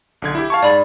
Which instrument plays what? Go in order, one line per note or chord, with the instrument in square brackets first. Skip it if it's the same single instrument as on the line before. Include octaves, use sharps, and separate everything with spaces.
[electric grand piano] B1 D3 G#6
E4 G4
F5 A5 C#6
[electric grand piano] G#2 [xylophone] D5 B5 A6